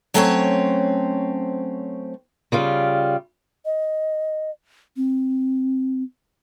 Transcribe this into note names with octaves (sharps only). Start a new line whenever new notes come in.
F#3 A3 C4 C#4 C5 C#5
C#3 G3 F4
D#5
C4